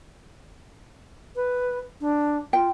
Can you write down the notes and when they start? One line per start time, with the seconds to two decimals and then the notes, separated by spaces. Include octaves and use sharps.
1.36 B4
2.01 D4
2.53 F4 G5